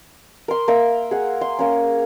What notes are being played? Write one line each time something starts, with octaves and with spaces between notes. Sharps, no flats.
A#4 C6
A#3 A#4 E5
G#4 F#5
C6
A#3 C#4